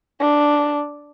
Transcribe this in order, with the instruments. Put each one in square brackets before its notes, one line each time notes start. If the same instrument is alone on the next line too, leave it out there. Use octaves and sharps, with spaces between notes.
[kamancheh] D4